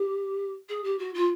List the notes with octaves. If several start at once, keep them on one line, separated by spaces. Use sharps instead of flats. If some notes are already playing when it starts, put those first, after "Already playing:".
Already playing: G4
G#4
G4
F#4
F4